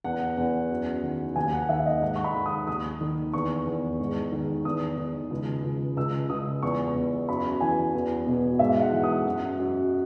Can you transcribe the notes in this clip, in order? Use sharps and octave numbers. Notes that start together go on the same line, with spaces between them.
E2 F#5
E2
F#2
D#3
D#2 G#5
F#5
D#3 E5
D#5
G#2 F#5
C#6
B5
D#3
D#6
D#2 D#6
D#3
E2 C#6
E2
G#2
D#3
E2 D#6
D#3
C#2
C#2
C#2 E6
C#2 D#6
E2 C#6
E2
F#2 B5
E3 G#5
E2
B2
G#2 E5
F#5
E3
D#6
F#2 F#5
F#2